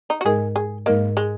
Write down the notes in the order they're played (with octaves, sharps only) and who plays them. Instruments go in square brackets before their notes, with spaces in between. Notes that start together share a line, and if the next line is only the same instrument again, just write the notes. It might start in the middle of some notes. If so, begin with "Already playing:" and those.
[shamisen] D#4
F#4
[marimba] G#2 G#3 D#4 A#4 D#5 [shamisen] G#4
[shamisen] G#4
[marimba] G#2 G#3 D#4 A#4 D#5 [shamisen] A#3
[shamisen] G#3